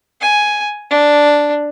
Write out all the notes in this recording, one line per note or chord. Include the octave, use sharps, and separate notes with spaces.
G#5
D4